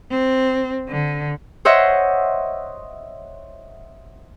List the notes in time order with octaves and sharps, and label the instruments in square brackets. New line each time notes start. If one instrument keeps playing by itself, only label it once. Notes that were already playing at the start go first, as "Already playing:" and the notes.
[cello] C4
D3
[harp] C5 C#5 D#5 E5 F#5